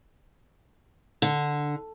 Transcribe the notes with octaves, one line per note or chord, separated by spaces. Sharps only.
D3